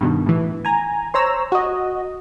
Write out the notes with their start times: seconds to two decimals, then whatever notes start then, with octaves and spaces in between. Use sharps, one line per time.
0.01 G2 B2 D#3
0.26 A2 E3
0.65 G#5 A#5
1.14 C5 C#5 A#5 E6
1.52 F#4 D#5